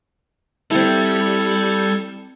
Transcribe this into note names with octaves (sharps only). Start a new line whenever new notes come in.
G3 C4 E4 A4 G#6 C#7